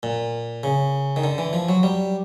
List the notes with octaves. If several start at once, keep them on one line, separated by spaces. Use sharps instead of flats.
A#2
C#3
D#3
D3
E3
F3
F#3
G3